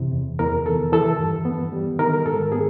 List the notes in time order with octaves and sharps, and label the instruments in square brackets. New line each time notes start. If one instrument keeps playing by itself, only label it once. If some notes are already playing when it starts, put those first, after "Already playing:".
Already playing: [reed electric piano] F#2 C3 E3
E2
E2 A#4
D#3 A4
E3 A4
G2
B3
G3
D#3 A#4
A#4
G#2 A4
B3 G#4